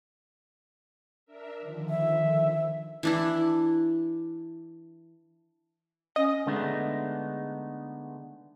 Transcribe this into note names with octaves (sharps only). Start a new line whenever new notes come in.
D4 A#4 E5
D3 D#3 F3
E5
E3 D4 E4
C#4 D#5
D3 G#3 A3 B3 D4 D#4